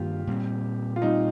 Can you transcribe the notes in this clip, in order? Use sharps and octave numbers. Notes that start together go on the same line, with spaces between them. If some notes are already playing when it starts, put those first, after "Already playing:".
Already playing: G2 D#3 A#3 D4 F4 G4
A#2 G3 C4
F4
A#2 G3 C4 D#4